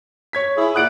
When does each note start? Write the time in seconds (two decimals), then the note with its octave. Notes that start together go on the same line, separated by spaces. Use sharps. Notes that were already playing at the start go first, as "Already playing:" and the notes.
0.33 C#5 G#6 B6
0.56 E4 G#4
0.75 A#2 D5 F#5 D#6 F#6 D7